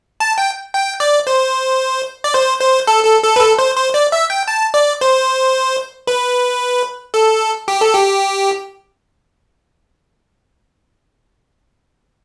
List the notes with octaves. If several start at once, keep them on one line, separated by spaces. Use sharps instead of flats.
A5
G5
G5
D5
C5
D5
C5
C5
A4
A4
A4
B4
A4
C5
C5
D5
E5
G5
A5
D5
C5
B4
A4
G4
A4
G4